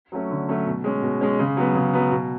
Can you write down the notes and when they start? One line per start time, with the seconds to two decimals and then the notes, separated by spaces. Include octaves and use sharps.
0.12 F#3 A3 C#4
0.30 D3
0.49 F#3 A3 C#4
0.66 B2
0.84 G#3 C#4
1.02 B2
1.21 G#3 C#4
1.39 C#3
1.57 F#3 B3
1.75 C#3
1.93 F#3 B3
2.11 B2